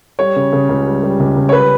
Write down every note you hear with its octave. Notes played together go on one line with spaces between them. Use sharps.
G3 C#5
C#3
C#3
C#2
G3
G3
C#2
C#2
C#5
G3 B4